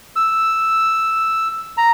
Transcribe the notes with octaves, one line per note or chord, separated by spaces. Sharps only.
E6
A#5